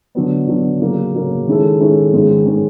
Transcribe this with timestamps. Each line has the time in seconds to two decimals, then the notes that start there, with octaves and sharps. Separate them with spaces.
0.15 D3 F#3 B3
0.48 D3 F#3 B3
0.80 C#3 F#3 A#3
1.13 C#3 F#3 A#3
1.46 D#3 G#3 C#4 E4 A4
1.80 D#3 G#3 C#4 E4 A4
2.13 G#2 D#3 G#3 C#4
2.46 D#3 G#3 C#4